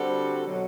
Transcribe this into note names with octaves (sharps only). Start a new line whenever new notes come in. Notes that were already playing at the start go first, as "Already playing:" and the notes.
Already playing: D3 G3 C4 F#4 A4
B2 F#3